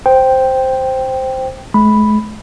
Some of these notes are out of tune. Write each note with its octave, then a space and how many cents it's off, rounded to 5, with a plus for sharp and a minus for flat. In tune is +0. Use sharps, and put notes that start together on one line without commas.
C5 +0 G5 +0
G#3 +45 B5 +0